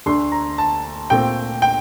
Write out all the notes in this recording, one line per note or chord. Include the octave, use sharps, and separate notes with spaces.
D2 D3 A3 D4 C6
A#5
A5
A#2 A3 C4 G5
G5